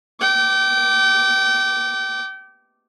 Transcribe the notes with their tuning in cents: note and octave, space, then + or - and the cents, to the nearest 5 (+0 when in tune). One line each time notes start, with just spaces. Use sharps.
G5 -30 D6 +0